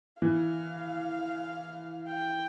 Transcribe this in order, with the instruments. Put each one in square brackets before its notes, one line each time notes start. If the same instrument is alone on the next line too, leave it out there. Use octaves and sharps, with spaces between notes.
[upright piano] E3 [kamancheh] F5
[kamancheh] G5